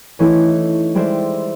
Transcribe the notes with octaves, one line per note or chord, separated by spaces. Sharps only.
E3 A3 C#4 D#4 E4
G3 G#3 C5 D5 E5